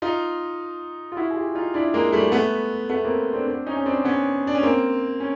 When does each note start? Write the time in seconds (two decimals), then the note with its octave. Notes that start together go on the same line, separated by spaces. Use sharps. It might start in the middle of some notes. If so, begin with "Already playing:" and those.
0.02 D#4 F4
1.12 F4
1.17 E4 F#4
1.31 G#4
1.36 F4 G4
1.55 D#4 F4
1.74 D4 E4
1.94 G#3 A#3
2.12 G3 A3
2.32 A3 B3
2.90 A3 B3
3.04 A#3 C4
3.33 C4 D4
3.47 C4 D4
3.67 C#4 D#4
3.77 C#4
3.86 C4 D4
4.05 B3 C#4
4.47 D4
4.55 C#4
4.63 A#3 C4
5.20 C#4